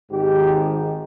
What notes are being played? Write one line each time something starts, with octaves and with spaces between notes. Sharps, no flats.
G#1 G#2 D#3 G4